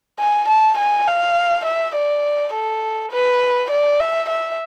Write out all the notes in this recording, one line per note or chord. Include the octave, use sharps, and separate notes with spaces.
G#5
A5
G#5
F5
E5
D5
A4
B4
D5
E5
E5